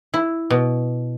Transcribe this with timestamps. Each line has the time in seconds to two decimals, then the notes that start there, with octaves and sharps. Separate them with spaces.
0.14 E4
0.50 B2